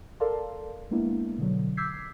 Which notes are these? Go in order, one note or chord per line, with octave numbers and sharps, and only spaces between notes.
A4 A#4 D5 F5 A5 C6
G#3 A#3 B3 D4 E4
B2 D3 F#3
D6 E6 G6 G#6 B6 C7